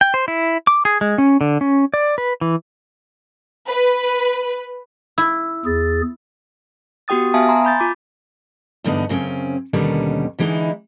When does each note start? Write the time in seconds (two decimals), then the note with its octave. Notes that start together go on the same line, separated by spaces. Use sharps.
0.01 G5
0.14 C5
0.28 E4
0.67 D6
0.85 G#4
1.01 G#3
1.18 C#4
1.41 D3
1.61 C#4
1.94 D5
2.18 B4
2.41 E3
3.67 B4
5.18 E4 E6
5.65 E2 G#4 A6
7.08 B3 F#4 G4 G5 D#6 A6
7.34 B3 E5 F5 G#5 A5 D#6
7.49 G#5 A#5 C6
7.65 B5 G6 A6
7.80 F4 D6
8.84 E2 G2 D3 B3 D#4
9.09 F#2 C#3 C4 C#4
9.73 D#2 B2 D3 D#3 G3 C#4
10.39 D3 E3 G#3 B3 D#4 E4